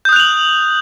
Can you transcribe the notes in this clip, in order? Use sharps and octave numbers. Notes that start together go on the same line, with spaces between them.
D#6 F#6 G6 F7 F#7